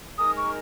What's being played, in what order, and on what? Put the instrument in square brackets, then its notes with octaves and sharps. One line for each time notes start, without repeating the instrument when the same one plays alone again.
[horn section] G#3 D#4 A#4 [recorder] D#6
[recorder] C#6